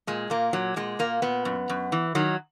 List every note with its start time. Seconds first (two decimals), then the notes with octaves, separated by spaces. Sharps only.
0.07 A#2 G#3
0.30 A#2 A#3
0.53 A#2 F#3
0.76 A#2 G#3
0.99 A#2 A#3
1.22 A#2 B3
1.45 F#2
1.69 F#2
1.92 E3
2.15 D#3 F#3